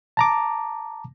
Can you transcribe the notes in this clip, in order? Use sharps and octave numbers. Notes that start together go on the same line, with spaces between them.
A5 A#5 D6